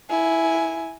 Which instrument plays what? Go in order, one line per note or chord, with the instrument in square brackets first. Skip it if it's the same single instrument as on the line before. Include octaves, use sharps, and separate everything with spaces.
[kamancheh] E4 G#5